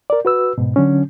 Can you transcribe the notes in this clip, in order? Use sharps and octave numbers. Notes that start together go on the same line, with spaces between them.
A#4 D5
F#4 B4 E6
G#2 B2
D3 F#3 C#4